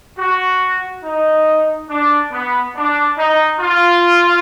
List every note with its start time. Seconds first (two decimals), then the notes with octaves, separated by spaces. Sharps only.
0.18 F#4
1.04 D#4
1.89 D4
2.32 B3
2.75 D4
3.18 D#4
3.60 F4